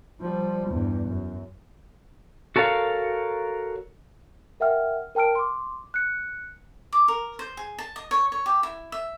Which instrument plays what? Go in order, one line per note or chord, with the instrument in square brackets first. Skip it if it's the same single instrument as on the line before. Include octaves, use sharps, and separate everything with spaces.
[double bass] F3 G3
E2 G2
F#2
[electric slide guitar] F#4 A4 A#4 C#5 F5
[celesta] A#4 E5 F#5 G5 F6
A#4 G5 A5 F6 D7
C6 D6
F#6 C#7
[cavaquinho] D6
A#4
C5
G#4
A5
D#5
C#5
C#5
G4
E4
E5